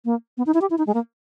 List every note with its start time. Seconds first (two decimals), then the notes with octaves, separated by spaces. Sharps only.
0.05 A#3
0.38 B3
0.46 D#4
0.54 E4
0.61 G4
0.70 E4
0.78 D#4
0.87 G#3
0.94 A#3